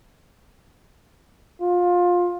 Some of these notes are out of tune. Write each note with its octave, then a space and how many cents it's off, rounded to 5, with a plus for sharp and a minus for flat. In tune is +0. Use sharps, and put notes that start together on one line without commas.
F4 +20